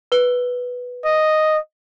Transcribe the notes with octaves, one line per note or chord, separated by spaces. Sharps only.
B4 G7
D#5